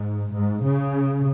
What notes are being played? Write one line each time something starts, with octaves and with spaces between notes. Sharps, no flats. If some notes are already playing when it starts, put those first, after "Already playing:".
Already playing: G#2
G#2
C#3